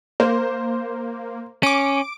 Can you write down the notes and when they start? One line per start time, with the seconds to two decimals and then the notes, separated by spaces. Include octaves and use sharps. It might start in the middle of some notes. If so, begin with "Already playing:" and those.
0.20 A#3 C5
1.63 C#4 D6 D7